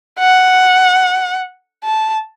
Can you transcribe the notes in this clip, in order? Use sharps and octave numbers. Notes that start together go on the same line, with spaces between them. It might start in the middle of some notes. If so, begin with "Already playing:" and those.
F#5
A5